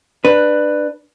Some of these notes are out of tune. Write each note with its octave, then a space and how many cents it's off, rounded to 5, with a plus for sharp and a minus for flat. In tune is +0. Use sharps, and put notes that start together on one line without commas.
D4 +20 B4 +0